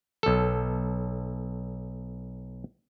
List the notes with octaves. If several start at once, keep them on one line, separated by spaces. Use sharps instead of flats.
B1 A4